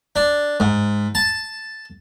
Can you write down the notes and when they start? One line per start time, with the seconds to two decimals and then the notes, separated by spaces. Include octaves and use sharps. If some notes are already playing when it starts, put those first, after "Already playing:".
0.16 D4
0.60 G#2
1.15 A5